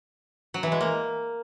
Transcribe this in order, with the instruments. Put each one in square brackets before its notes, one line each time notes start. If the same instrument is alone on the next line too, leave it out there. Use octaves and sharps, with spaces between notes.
[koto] F#3
E3
G#3
A#3